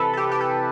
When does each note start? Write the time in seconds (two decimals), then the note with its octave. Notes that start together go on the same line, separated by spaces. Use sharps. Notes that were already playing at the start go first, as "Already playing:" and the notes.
Already playing: C3 E3 A4 B4
0.13 A4
0.17 G4
0.32 G4
0.41 A4